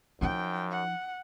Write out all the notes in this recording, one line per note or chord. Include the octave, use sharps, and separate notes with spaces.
F#2 F3 D#4 G5
F#5